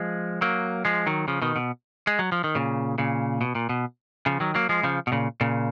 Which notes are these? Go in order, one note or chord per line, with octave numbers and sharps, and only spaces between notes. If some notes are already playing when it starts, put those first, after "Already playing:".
Already playing: F3 G#3
F#3 A#3
F3 G#3
D#3 F#3
C#3 F3
B2 D#3
B2
G#3
F#3
F3
D#3
A#2 C#3
A#2 C#3
B2
A#2
B2
C#3 F3
D#3 F#3
F#3 A#3
F3 G#3
C#3 F3
B2
A#2 C#3
A#2 C#3